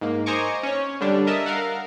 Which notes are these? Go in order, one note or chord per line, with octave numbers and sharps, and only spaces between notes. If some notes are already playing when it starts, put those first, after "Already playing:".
G#2 A#3
C5 D#5 G#5 A#5 C#6 D6
C#4 C#5
D3 G3 D4
A#4 D#5 E5 A5
A#4 F5 F#5